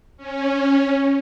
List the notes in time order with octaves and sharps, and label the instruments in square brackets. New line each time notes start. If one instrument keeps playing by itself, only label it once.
[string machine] C#4